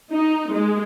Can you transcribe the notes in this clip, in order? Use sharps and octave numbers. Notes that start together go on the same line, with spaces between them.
D#4
G#3